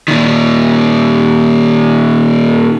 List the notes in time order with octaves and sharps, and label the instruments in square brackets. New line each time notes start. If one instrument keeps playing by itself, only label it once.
[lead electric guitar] A#2 D#3